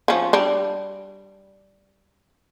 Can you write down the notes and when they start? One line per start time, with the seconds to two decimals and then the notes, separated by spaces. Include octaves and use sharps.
0.08 F3 C#4
0.33 G3 D4